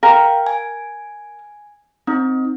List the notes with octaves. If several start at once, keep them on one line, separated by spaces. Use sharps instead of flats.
A#4 F5 G5
G#5
C4 D#4